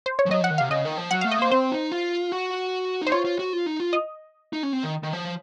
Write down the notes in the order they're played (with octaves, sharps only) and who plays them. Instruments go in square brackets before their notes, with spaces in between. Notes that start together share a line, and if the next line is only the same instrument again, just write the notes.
[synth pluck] C5
C#5
[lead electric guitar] F3
[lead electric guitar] F#3 [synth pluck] D#5
[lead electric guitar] F3 [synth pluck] F#5
[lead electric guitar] D#3
[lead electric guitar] C3 [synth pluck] F5
[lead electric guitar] C#3 [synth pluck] D#5
[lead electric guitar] D#3
F3
[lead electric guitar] F#3 [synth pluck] F#5
[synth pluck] F5
[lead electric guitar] A3
[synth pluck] D#5
[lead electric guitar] A#3 [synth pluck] C5
[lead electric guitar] C4 [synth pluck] C5
[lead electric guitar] D#4
F4
F#4
D#4
[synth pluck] C5
[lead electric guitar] F4 [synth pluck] C#5
[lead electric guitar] F4
F#4
F4
D#4
F4
[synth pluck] D#5
[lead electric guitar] D#4
C#4
C4
D#3
D#3
F3